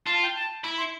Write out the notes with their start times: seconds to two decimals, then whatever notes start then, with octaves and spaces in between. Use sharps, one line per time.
0.06 F4 A5
0.22 G5
0.35 A5
0.64 E4 B5
0.78 C6